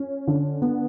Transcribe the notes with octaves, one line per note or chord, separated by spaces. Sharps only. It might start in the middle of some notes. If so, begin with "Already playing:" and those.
Already playing: C#4
D3
B3